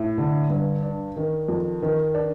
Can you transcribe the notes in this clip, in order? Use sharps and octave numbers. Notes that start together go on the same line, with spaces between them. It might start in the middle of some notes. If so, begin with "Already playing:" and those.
Already playing: A2
D3
G2
D4
D#3
F2
D#3
D4